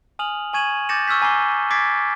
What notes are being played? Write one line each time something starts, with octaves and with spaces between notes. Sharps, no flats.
G#5 D#6 F6 F7 F#7
G#5 C#6 G#6 D#7 E7 F#7
D6 G6 A6 A#6 C#7 E7
C#6 E6 F6 G6 B6
G#5 A#5 D6 C7 G7
D6 G#6 A6 B6 C7 D7